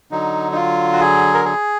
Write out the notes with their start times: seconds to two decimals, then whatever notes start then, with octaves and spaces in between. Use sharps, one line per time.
0.11 D3 F#3 D#4
0.52 D#4
0.56 F4
0.93 F#4
1.00 G#4
1.34 A#4
1.45 G#4